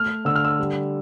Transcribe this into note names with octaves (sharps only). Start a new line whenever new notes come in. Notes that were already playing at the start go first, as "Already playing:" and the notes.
Already playing: A3 F6
D3 E6
F6
E6
G3